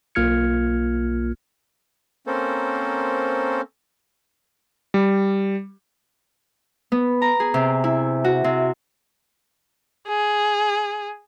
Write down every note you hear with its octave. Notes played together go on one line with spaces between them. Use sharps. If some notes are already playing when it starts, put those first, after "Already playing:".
B1 A#3 F4 F6 G#6 C#7
A#3 C4 C#4 A4 A#4 C5
G3
B3
A#5
G#4
C3
E4
F#4
C3
G#4